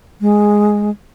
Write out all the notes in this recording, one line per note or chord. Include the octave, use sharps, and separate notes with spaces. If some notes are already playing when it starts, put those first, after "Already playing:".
G#3